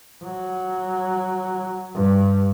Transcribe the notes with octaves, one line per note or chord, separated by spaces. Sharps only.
F#3
G2